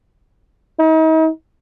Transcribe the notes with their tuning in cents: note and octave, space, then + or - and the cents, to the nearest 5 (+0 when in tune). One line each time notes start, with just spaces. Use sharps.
D#4 +40